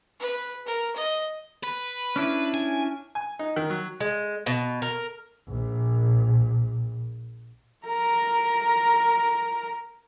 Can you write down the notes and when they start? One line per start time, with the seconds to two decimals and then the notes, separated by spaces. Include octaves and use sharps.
0.20 B4
0.67 A#4
0.96 D#5
1.64 B4
2.16 C#4 D4 E4
2.54 G#5
3.15 G#5
3.39 D#4
3.56 D#3
3.70 F#3
4.00 G#3
4.46 B2
4.82 A#4
5.48 A#1 A#2
7.86 A#4 A#5